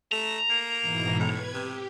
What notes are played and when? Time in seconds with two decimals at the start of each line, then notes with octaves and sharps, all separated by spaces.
0.12 A3 A#5
0.50 A#3
0.81 G#2 B2 E3
1.20 A2 B4 G#6
1.54 C3 G4